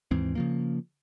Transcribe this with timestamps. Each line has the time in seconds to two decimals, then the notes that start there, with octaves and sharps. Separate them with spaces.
0.11 D#2 G#2 E3 C4
0.35 C#3 F3 A#3